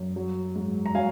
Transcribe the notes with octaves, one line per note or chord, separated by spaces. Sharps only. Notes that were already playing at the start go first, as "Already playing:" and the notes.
Already playing: F#2
F#3
G#2
A#5
F#3 F5 G#5